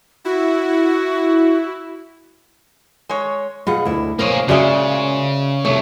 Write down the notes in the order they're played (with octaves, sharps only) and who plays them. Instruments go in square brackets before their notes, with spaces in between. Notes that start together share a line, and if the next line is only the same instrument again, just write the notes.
[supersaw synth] E4 [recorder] F#4
[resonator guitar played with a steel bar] G#3 C#5
[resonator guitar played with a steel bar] B2 [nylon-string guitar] F4 G#4 F#5
[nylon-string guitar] D2 E4
[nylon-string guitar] B2 [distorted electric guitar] A#3 G#4 [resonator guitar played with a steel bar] A#4 C5 C#5
[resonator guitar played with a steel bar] A#2 G#3 [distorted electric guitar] C#3 [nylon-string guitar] F#4 D5 E5
[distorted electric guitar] C2 A3 [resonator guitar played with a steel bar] C#5